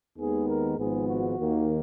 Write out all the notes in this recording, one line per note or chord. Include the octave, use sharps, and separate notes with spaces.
D#2 D#3 G#3 B3 G#4
A#4
G#1 G#2 F3 B3 G#4
F#4
D#2 D#3 A#3